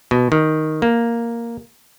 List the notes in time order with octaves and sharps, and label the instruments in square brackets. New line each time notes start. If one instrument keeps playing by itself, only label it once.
[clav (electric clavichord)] B2
D#3
A#3